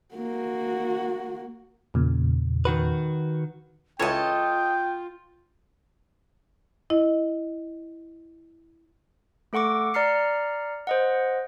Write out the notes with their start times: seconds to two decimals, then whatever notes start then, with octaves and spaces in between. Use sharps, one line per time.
0.15 A#3 F#4
1.94 E2 A#2 C#3
2.65 D#3 F#4 B4
3.99 C#2 E3 F4 A4 C#5 D#5 G5
6.90 E4 D#5
9.53 A3 A4 F#5 C#6 D6
9.94 D5 A#5 F6 C7 C#7
10.87 C5 D#5 F#5